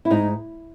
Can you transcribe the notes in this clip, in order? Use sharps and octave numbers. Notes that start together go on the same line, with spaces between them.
E4
G#2 D#4